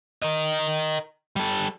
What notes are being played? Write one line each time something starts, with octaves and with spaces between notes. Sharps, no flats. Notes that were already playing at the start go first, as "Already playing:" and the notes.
A#4 D#5
G3 A4